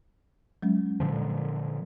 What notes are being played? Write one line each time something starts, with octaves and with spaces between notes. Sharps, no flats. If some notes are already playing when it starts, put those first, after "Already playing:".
F#3 G#3 C#4
A#2 D3 F3